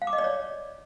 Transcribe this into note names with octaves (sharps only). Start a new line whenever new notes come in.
F5
D6
D#5
D5
C#5